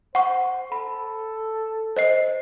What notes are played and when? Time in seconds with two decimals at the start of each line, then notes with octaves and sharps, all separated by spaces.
0.15 C5 F#5 C#6
0.72 A4 B5
1.96 C5 D#5 C7